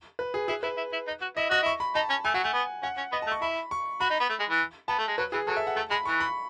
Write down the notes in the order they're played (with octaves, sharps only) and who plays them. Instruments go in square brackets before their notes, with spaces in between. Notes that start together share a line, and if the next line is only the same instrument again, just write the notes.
[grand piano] B4
G#4
[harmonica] E4 [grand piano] G#4
[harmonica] E4 [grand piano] B4
[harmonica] E4
E4
D#4
F#4
[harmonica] E4 [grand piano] D#5
[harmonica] F#4 [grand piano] D#5
[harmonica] E4 [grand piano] C#6
[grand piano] B5
[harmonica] D#4 [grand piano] A5
[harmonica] C#4
[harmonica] A3 [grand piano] G#5
[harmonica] F#3 [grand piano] F#5
[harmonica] A3 [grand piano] G#5
[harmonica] B3
[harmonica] C#4 [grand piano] F#5
[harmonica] C#4
[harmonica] B3 [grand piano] D#5
[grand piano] A5
[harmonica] A3
[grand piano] C#6
[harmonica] E4 [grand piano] B5
[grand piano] C#6
[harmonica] F#4 [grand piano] B5
[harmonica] D#4
B3
A3
G#3
E3
[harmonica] B3 [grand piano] A5
[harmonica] A3
G#3
[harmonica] F#3 [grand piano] B4
[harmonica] E3 [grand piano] G#4
[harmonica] F#3 [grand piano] A4
[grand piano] E5
F#5
[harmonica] A3 [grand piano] A5
[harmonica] G#3 [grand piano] B5
[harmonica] E3 [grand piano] C#6
[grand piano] B5